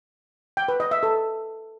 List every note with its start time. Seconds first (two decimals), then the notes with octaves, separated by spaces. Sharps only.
0.57 G5
0.68 B4
0.80 D#5
0.91 E5
1.03 A4